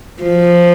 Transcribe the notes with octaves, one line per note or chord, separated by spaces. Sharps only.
F3